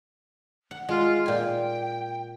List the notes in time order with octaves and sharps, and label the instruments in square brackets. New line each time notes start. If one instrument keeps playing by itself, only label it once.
[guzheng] F#5
[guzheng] G#3 [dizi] F4
[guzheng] A#2 G#5 [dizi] G5